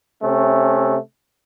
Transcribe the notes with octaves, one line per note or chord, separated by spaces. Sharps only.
C3 A3 C#4